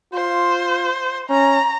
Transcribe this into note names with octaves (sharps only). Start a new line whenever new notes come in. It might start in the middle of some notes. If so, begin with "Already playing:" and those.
F4 C5
C#4 A#5